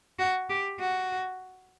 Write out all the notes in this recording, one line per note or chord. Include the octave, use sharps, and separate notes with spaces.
F#4
G4
F#4